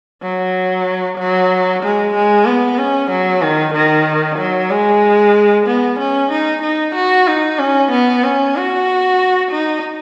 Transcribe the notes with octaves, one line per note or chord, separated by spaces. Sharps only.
F#3
F#3
G#3
G#3
B3
C#4
F#3
D#3
D#3
F#3
G#3
B3
C#4
D#4
D#4
F#4
D#4
C#4
B3
C#4
F#4
D#4